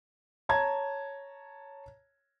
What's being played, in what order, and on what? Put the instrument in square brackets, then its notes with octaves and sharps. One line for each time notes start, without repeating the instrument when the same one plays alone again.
[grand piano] C#5 A5 A#5 G#6